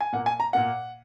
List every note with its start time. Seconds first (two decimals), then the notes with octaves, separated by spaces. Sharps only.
0.01 G#5
0.13 A#2 A#3 F#5
0.26 G#5
0.40 A#5
0.53 A#2 A#3 F#5